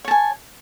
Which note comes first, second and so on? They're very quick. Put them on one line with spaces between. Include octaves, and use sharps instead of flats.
C#5 A5 G#5